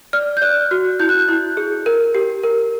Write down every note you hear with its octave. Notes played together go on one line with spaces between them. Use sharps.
D5 F6
G6
D5 F#6
F#4 F6
E4 G6
F#6
G6
E4
G#4
A#4
G4
A#4